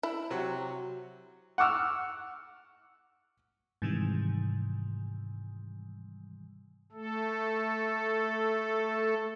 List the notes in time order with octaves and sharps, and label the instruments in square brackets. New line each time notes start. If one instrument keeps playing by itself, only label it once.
[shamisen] E4
[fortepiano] C3 F#3
F#5 C#6 D6 E6 F6
[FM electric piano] G#2 C3 D#3 E3 G3
[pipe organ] A3 A4